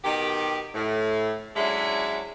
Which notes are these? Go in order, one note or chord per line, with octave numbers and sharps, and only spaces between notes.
B2 D#3 D#4 G4
A2
F#3 G#3 C#4 D4 E4 E5